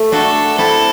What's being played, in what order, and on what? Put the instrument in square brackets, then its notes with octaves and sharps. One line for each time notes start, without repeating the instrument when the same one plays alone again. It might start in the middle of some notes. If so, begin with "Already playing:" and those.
Already playing: [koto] A3
[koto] D4 F#4 [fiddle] A4
[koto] C4 E4 [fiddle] A4